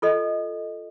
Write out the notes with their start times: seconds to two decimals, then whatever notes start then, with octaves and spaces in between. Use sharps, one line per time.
0.02 F4 A4 D#5